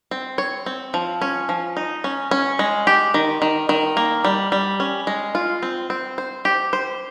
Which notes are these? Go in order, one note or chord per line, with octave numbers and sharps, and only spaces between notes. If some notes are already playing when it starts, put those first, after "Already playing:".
C4
C#5
C4
F3
C#4
F3
D#4
C#4
C#4
G#3
G4
D#3
D#3
D#3
A#3
G3
G3
C#4
G#3
F4
C4
C4
C5
G4
C5